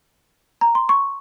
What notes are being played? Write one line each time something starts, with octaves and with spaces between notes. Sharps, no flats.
A#5
C6
C#6